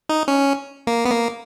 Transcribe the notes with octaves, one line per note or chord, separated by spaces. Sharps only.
D#4
C#4
A#3
B3
A#3